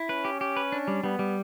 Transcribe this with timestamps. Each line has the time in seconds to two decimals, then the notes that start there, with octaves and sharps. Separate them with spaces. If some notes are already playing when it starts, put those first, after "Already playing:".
Already playing: E4
0.09 C#4 B4
0.25 G4
0.41 G4
0.57 B4
0.72 D4
0.88 G3
1.04 G3 B3
1.19 G3